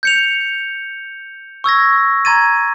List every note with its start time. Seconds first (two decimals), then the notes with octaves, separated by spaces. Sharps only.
0.03 G6 C#7 F7
1.64 C#6 E6 G#6 A#6
2.25 A#5 C6 G#6 A6 D#7